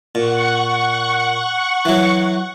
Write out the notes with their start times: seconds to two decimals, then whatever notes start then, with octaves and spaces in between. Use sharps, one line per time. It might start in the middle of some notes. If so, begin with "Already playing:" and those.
0.15 A#2 F#5 C#6
1.85 E3 F#3